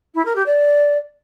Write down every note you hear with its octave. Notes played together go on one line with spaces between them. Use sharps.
E4
A#4
G4
D5